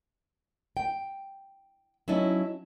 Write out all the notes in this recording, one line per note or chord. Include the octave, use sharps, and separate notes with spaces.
G5
F#3 C#4 D#4 E4 A5